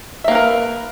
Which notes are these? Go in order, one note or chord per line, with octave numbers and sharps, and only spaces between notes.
A#3 A#4 B4 E5